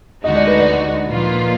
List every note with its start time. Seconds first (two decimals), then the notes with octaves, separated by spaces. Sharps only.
0.24 D2 D3 G#3 D#4 F#4 D#5
0.36 D5
0.47 B4
0.59 D5
1.09 A#2 F3 A#3 F4 B4